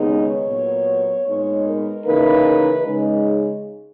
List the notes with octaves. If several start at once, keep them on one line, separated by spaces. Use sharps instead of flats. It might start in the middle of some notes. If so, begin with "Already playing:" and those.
Already playing: D#2 C#3 G#3 B3 D#4
C#5
A#2 F#3 B3
A#2 G#3 B3 D#4 C#5
A#4
C#3 E3 A#3 D#4 B4
C#3 G#3 D#4